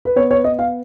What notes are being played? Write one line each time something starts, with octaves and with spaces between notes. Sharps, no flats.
B4
B3 C#5
C#5
B3 D#5
F5